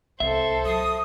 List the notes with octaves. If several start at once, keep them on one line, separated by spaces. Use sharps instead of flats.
C2 A4 C5 E5
F#3 D#6